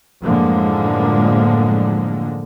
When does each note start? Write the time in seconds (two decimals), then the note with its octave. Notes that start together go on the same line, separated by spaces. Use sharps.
0.23 F#2 A2 D3 F3 G#3 A#3